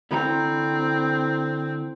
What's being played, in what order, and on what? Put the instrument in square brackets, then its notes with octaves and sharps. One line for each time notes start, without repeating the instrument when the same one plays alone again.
[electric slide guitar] D3 E4 A#5 [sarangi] C4